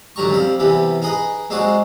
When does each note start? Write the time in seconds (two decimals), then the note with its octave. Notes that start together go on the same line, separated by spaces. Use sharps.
0.16 D3 F#3 G3 A#5 C#6
0.29 F2 G3 C4 F5
0.60 C3 E3 G3 B3
1.02 D#4 G#4 B4 D#5
1.50 G#3 C4 D4 D#4 F#4